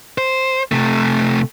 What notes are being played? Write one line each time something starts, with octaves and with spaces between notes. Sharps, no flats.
C5
C3 A3